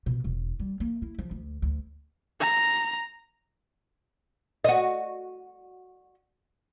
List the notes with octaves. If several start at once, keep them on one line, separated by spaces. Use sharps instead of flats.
B2
E1
G3
A#3
E4
F3
D2
D2
A#5
F#4 D#5